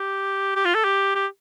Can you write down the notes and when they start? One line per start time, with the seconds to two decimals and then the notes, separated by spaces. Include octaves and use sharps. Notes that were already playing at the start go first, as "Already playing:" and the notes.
Already playing: G4
0.56 G4
0.65 F4
0.75 A4
0.84 G4
1.15 G4